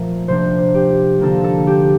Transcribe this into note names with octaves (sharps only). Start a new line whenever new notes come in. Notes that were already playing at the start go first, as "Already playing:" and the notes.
Already playing: A#2 F3 A3 A#4
C3 F3 A#3 D4 C5
G4
D3 F3 A#3 D4 A4
A4
G4